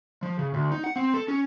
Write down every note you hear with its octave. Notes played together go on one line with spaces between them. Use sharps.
F3
C#3
D2
D#4
F#5
C4
A4
C#4